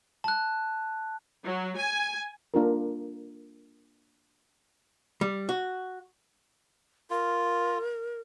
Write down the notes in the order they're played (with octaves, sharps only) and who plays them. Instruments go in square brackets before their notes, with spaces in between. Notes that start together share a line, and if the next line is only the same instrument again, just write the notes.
[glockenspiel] A5 F#6
[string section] F#3
G#5
[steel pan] A#3 D4 F4 A#4
[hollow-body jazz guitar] G3
F#4
[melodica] F4 [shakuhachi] A#4